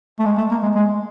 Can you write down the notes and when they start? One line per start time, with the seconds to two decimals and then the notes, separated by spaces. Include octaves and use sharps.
0.19 A3
0.26 G#3
0.38 A3
0.51 A#3
0.63 G#3
0.75 G#3